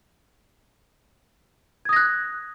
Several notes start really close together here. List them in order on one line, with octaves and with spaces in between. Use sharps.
G#6 D#6 A#6 F#6